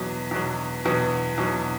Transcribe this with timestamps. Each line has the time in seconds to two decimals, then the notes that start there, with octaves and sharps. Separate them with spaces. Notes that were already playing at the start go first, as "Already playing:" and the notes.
Already playing: E2 B2 F#3
0.31 E2 B2 F#3
0.85 E2 B2 F#3
1.38 E2 B2 F#3